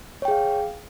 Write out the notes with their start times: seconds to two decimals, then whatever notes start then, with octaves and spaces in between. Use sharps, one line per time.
0.22 C#5
0.25 G5
0.28 G#4
0.31 F5